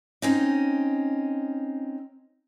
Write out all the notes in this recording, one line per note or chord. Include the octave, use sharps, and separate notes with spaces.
C4 C#4 D#4